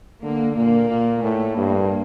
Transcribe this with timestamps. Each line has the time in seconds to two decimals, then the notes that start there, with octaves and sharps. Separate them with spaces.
0.23 D3 A#3
0.57 A#2 A#3
0.90 A#2
1.23 A2 A3
1.56 G2 A#3